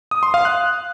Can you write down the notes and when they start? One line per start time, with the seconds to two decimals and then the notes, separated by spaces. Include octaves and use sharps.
0.11 D#6
0.23 C6
0.34 F5
0.45 F#6